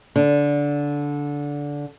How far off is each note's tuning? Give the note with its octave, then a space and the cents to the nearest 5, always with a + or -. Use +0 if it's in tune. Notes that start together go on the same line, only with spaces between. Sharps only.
D3 -15